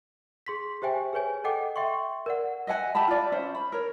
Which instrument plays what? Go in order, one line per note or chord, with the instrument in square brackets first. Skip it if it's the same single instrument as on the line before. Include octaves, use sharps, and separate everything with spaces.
[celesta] G#4 C6 B6
G4 C5 E5 G5 G#5
G#4 B4 C#5 G#5
A4 D#5 F#5 G5 D6
E5 G5 C6 C#6
A#4 D5 F#5
[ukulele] D#5 E5 F#5 G#5
G4 E5 A5 B5
F4 D5
C#4 C5 E5
B5
A#4 C#5